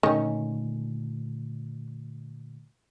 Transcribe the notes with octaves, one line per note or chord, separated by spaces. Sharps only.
A#2 D3 D#3 A3 C#4